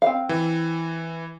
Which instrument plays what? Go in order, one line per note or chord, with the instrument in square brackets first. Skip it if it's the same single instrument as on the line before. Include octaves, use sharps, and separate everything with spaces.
[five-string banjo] C4 F5
[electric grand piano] E3